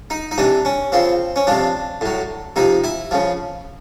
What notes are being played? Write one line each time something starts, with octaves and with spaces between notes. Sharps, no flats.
D#4
D#4
C3 E3 D4
C#4
C#3 F3 C4
C#4
C3 F3 D4
A2 F#3
C3 F3 D#4
E4
C#3 F3